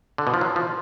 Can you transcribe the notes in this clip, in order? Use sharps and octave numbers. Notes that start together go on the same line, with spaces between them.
D3
B2
F3
F#3
F3